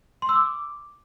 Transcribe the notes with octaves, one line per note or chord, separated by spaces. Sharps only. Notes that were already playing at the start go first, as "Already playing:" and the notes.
C6
E6
D6